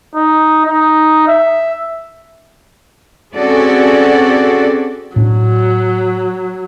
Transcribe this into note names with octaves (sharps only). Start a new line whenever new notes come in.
D#4
D#4
E5
C4 C#4 F#4 G#4 A4 D5
A2 F#3 C4 D4